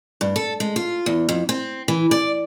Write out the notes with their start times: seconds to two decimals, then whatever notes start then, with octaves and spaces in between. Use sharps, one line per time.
0.21 G2
0.36 A4
0.60 G#3
0.76 F4
1.06 E2
1.29 F2
1.49 C4
1.88 E3
2.11 D5